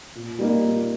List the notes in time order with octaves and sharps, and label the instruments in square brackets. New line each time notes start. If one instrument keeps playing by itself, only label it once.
[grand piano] A#2
G3 A#3 D#4
A#2